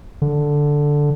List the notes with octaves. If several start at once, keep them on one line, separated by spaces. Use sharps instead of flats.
D3